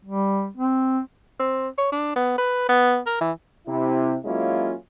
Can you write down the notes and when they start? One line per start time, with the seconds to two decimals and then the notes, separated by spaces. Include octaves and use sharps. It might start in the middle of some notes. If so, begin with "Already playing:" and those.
0.05 G3
0.57 C4
1.39 C4
1.78 C#5
1.92 D4
2.16 B3
2.38 B4
2.69 B3
3.06 A#4
3.21 E3
3.68 C3 E4
4.25 F#3 G#3 A#3 C#4 E4 F4